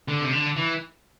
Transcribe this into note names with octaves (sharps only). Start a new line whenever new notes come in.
D3
C3
D3
E3